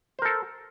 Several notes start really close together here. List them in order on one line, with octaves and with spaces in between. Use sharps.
C5 A#4 A4